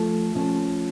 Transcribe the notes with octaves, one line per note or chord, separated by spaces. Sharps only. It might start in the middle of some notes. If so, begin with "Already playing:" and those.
Already playing: F3 A3 F4
F3 A3 C#4